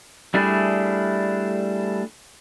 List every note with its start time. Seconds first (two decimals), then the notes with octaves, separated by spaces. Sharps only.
0.34 G3 A3 D4 E4 G#4